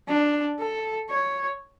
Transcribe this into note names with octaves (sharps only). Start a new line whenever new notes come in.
D4
A4
C#5